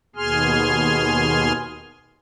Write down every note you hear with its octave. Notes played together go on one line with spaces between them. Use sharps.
D#2 B2 G#4 G#5 C6 F6